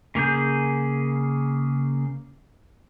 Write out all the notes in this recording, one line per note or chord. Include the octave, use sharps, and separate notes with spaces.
C#3 A#3 G#4 G6